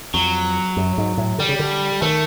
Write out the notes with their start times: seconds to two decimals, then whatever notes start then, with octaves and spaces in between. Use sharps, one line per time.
0.14 F2 F#3
0.77 F#2
0.98 G#2
1.17 A2
1.38 D3 G3
1.49 C#3
1.59 D3
2.02 D#3 A3